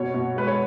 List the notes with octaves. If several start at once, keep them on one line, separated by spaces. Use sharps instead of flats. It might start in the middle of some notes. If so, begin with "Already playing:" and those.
Already playing: B2 C#5
B2
G#3 B4
C#5